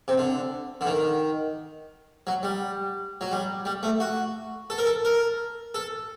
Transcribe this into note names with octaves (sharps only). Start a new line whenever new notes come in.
C3
D3
D3
D#3
F#3
G3
F#3
G3
G3
A3
F#4
A4
A#4
A4
A#4
A4